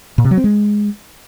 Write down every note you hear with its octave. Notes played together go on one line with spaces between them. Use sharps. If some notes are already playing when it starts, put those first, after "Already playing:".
A#2
C3
F#3
C4
G#3